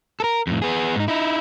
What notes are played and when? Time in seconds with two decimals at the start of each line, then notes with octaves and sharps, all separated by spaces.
0.20 A4 A#4
0.47 F2 A2
0.62 B3 G#4
0.96 G#2 D#4
1.08 D#4 E4